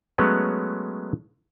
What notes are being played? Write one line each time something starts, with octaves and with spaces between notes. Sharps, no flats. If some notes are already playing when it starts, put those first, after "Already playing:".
F#3 G#3 A3 B3 C#4